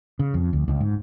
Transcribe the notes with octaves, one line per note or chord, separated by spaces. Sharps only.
C#3
F2
D2
C#2
G#2